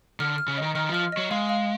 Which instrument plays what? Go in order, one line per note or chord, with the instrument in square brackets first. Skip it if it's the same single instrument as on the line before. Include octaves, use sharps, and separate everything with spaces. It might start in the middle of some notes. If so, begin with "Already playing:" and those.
[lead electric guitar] D3 [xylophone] F6
[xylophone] F6
[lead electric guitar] C#3
[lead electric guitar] D#3 [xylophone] D#5
[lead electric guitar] D#3 [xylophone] F6
[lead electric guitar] F3
[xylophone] F6
[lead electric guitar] F#3 [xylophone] D#5
[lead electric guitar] G#3 [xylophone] F5
[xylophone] F5